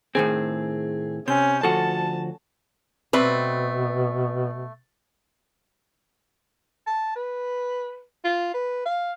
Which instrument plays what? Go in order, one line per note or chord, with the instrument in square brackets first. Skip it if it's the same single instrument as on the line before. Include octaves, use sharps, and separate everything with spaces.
[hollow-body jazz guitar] A2 D#3 C4 [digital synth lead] G#4
[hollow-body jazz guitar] C3 [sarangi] C#4 [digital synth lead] G6
[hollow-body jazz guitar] D2 F3 F#4 [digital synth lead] A4 [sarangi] A5
[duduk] B2 [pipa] G3 A3 [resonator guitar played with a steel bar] C4 B4
[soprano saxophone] A5
B4
F4
B4
F5